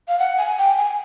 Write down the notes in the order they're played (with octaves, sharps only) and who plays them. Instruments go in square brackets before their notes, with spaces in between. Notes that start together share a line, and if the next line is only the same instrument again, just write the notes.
[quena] F5
F#5
G#5
G5
G#5